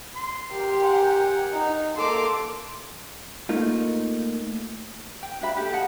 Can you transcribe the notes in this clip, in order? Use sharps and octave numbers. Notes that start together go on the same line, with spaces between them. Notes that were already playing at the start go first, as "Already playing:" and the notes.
C6
G4 A#4
F#5 G#5
D#4
A#3 A4 C6 D6
A3 A#3 D#4 F4
G5
D4 F#4 E5 B5
G4 A4
D#5 F#5 A5